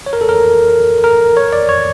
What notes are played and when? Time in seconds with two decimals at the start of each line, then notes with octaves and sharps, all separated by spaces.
0.06 C#5
0.13 A#4
0.21 A4
0.29 A#4
1.04 A#4
1.37 C#5
1.53 D5
1.69 C#5